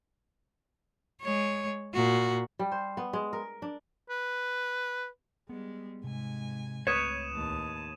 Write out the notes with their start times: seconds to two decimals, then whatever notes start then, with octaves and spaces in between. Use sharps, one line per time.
1.22 G#3 C#5
1.94 A#2 F#4
2.59 G3
2.72 C5
2.97 B3
3.13 G#3
3.33 A#4
3.62 D4
4.10 B4
5.49 G3 G#3 B3
6.04 G#2 C3 G#5
6.87 C#2 A3 C4 B4 C#5 D#6 D#7 E7
7.33 D#2 A2 A5